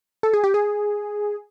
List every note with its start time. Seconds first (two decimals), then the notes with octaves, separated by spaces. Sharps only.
0.23 A4
0.33 G#4
0.44 G4
0.54 G#4